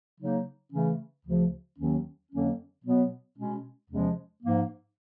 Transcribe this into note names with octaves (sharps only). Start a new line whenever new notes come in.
C#3 F#3 A#3 D#4
C#3 E3 A3 C#4
D2 C#3 F3
D#2 D#3 F#3 A#3 C#4
F2 D3 F#3 A#3 C#4
B2 F#3 B3
B2 G#3 C#4
E2 C3 F3 G#3 C#4
G#2 F3 A#3